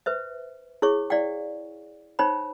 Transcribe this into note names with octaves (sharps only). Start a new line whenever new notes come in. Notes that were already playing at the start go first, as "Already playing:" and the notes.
B4 C5 E5
E4 G#4 C#5 C#6
E4 D5 F5 G5
D#4 C5 C#5 G5 B5